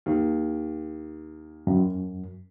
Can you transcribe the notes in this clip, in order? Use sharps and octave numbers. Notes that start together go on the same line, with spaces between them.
D#2
F#2